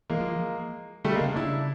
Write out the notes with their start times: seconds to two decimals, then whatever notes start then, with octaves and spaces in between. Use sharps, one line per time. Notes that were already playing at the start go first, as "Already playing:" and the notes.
0.10 E3 G#3 A#3
0.21 F3
1.04 D3 G3 A3
1.15 G#3 A#3
1.21 C#3
1.36 C#3 D4 E4